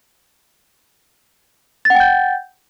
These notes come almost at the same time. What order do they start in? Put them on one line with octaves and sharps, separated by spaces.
A6 F#5 G5 G6